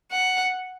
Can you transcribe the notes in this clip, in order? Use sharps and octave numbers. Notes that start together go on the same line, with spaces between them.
F#5